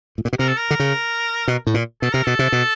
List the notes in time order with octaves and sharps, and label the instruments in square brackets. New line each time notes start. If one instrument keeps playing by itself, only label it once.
[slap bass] A2
A#2
B2
[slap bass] C3 [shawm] A#4
[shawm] A4
A#4
[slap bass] D3
C#3
B2
A2
A#2
[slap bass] B2 [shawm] A4
[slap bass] C3 [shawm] A#4
[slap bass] B2 [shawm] A4
[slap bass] C3
B2